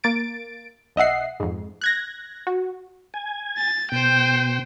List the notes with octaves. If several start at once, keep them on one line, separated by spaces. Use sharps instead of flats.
A#3 A6 D7
B1 D#5 E5 F#5 C7
F2 G#2
F#6 G#6 A#6
F#4
G#5
A6
B2 C5 G5